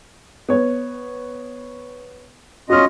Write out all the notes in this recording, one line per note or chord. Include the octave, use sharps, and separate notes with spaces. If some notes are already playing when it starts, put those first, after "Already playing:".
B3 C#5
C#4 F4 F#4 D#5 F6